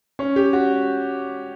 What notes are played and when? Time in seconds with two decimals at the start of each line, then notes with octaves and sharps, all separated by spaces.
0.19 C#4
0.36 G4
0.53 F#4